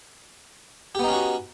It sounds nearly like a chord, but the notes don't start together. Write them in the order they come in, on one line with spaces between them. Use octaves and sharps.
G4 B3 D#4 C#4 F#4